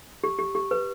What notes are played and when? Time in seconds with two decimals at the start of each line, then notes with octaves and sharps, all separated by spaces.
0.24 G4
0.39 G4
0.55 G4
0.71 B4